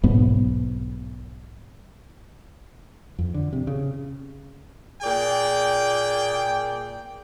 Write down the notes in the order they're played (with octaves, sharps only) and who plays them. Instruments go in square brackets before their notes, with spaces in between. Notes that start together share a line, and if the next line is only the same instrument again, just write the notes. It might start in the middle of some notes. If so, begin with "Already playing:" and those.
[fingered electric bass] B1 G#2 B3
F2
D3
C3
C#3
[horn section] A#2 G#4 D5 G5